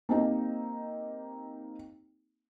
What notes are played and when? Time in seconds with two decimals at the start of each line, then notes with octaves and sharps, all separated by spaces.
0.09 A#3 C4 D#4 G4